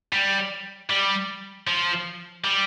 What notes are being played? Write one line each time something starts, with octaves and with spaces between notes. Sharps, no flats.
G3
G3
F3
G3